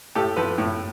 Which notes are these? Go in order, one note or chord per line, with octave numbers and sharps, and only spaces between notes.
A2 G4 A4
F3 A4 B4
A2